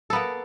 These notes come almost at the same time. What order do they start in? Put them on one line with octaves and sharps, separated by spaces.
A4 B3 A#3